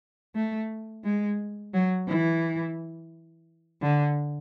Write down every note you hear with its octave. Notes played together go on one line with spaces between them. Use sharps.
A3
G#3
F#3
E3
D3